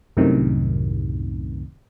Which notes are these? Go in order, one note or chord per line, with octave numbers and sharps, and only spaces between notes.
C2 F#2 A2 C3 D#3